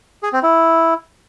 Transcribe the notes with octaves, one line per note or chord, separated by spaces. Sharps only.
G#4
C4
E4